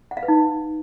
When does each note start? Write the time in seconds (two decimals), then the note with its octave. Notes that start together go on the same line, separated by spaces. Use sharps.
0.11 F#5
0.17 F5
0.23 B4
0.28 D#4